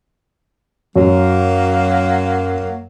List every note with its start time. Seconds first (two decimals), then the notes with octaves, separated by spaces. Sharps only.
0.96 F#2 F#3 A#3